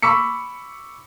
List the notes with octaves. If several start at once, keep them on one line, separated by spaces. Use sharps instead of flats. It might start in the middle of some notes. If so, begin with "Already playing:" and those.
B5 C#6 D6 E6 B6 C#7